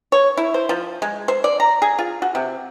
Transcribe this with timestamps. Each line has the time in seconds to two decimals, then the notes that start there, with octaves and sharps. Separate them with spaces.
0.12 C#5
0.37 E4
0.54 C5
0.69 F3
1.02 G#3
1.28 C5
1.44 D5
1.60 A#5
1.82 G#4
1.99 F4
2.22 F#4
2.35 C3